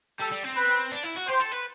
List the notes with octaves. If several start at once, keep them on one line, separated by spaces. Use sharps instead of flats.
G3 A4
G3
C4
B4
D4
E4
F#4
G4 C5
A4
B4